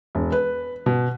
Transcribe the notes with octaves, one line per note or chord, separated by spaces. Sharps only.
E1
B4
B2